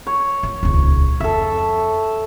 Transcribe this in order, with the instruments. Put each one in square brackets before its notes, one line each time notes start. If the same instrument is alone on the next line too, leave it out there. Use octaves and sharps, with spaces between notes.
[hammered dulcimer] C#5
[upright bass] F3
D#1 C#2
[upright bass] F2 [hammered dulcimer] A4 E5